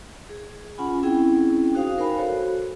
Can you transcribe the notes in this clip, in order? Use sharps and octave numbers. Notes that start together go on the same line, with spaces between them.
G#4
C#4 F4 F#5 G#5 B5
C4 C#4 E4 G#4 G5
D#4 F#4 C5 F5 G5 D#6
A#4 C5 F5 G#5 B5
F#4 A4 C5 C#5